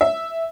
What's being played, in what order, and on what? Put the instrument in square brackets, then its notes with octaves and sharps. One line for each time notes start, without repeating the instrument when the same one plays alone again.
[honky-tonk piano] E5